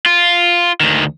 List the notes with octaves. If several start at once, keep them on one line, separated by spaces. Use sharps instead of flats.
F4
D2 D#3